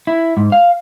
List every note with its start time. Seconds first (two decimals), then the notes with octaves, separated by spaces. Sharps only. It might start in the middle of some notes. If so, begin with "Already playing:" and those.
0.07 E4
0.37 G#2
0.52 F5